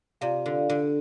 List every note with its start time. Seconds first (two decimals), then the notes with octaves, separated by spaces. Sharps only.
0.21 C3 F4 D5 F5
0.46 D3
0.69 D3